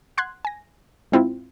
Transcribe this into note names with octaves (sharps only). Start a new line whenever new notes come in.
F#5 C6 F#6 G#6
G#5 A#6
G#2 C4 E4 F4